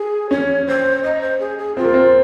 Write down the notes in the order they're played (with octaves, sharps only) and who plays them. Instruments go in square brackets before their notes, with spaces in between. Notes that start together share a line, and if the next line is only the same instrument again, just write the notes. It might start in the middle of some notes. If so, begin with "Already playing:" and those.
Already playing: [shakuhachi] G#4
[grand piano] C#4 [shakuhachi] C#5
[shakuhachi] C5
D#5
C5
G#4
G#4
[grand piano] C4 [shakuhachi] F4
[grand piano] A#3
C4